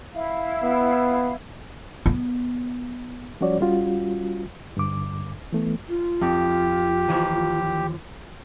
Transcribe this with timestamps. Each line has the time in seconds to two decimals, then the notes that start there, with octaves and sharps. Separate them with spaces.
0.14 E4 F5
0.63 B3
2.06 B3
3.41 F3 G3 C#4 F#4 C#5 D5
3.61 G3 C#4 F4 F#4
4.77 G2 D3 D6
5.52 E3 A3 B3
5.88 F4
6.21 F2 G4
7.09 D#2 E3 F3